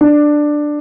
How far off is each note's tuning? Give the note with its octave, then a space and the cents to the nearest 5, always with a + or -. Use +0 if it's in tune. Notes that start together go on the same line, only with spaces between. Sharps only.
D4 +10